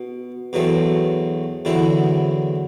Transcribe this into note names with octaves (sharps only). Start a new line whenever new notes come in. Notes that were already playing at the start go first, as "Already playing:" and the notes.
Already playing: B2
E2 B2 F#3 A3 C4
E2 D3 F#3 C4 E4